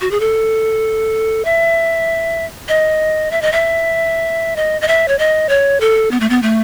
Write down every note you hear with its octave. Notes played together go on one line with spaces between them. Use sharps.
F#4
G#4
A4
E5
D#5
E5
D#5
E5
D#5
D#5
E5
C#5
D#5
C#5
A4
B3
A3
B3
A3